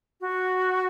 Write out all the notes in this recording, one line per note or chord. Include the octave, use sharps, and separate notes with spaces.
F#4